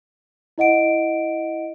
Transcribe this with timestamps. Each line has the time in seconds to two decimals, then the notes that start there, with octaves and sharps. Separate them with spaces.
0.58 E4 D#5 F#5 D7